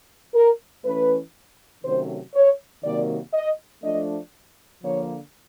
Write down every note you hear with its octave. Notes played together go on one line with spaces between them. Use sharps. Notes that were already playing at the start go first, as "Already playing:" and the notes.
A#4
E3 A3 C#4 B4
C3 D#3 F#3 A3 C#4 C5
C#5
C3 D#3 F#3 A#3 D5
D#5
F3 A3 D4 D#5
D3 F3 A#3 C#5